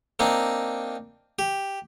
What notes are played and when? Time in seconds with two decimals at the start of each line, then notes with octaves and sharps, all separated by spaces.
0.19 A#3 C4 D4 D#4
1.39 G4